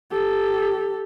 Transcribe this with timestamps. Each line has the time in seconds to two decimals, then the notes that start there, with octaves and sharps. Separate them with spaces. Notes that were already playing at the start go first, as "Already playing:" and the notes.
0.11 G4 A4